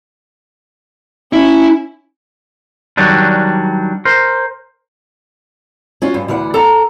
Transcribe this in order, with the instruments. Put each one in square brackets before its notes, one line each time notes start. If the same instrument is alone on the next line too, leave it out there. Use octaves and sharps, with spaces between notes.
[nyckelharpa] C#4 [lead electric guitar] E4
[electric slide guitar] D#3 F#3 G3 D4
A#4 C5
[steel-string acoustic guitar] C#4 F4 F#4
G2
D2 E3 D5 F#5
A4 F#5 A#5